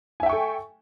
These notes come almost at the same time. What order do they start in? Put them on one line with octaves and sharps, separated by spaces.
G#5 E5 G5 C#6 A4